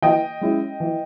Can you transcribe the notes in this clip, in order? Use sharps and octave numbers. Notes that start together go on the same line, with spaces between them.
E3 D#5 G5
G#3 C#4 E4
E3